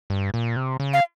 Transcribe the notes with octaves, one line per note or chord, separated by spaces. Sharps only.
G2
A#2
C3
C#3
F5